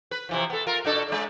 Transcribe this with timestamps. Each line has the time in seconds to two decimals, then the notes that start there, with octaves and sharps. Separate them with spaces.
0.11 B4
0.29 C3 E3 F3
0.50 B3 A4
0.67 F4 A#4
0.85 B2 D4 A4
1.08 G#3 C#4 D4